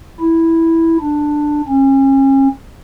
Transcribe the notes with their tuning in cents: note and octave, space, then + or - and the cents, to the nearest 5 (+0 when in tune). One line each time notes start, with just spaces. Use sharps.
E4 -5
D4 +10
C#4 -35